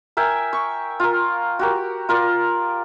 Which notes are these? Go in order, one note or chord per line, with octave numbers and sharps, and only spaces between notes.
A#4 E5 G5 G#5
C#6
F4 A#4
F#4 G4 A#4
F4 A#4 D5